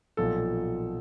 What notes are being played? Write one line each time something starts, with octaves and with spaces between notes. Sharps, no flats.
B1 A#2 F3 A4